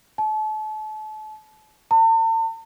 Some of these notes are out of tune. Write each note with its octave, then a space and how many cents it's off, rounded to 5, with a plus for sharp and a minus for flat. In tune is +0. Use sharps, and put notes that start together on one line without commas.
A5 -35
A5 +40